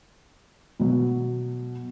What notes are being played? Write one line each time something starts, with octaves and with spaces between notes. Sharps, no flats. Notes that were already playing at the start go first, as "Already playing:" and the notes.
B2 F#3